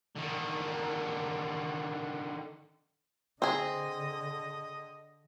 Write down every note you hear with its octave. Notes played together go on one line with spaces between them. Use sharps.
D3 D#3
D3 C4 G#4 D#5